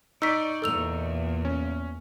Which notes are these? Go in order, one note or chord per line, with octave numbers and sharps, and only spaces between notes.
D#4 D5 C#6 E6 B6
E2 A#2 A4 E6 F7
C#4